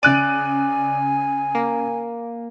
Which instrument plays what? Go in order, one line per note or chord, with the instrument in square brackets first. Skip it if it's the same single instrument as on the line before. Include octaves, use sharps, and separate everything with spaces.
[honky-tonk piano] C#3 F#6 D#7 [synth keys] D5 [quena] G#5
[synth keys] A#3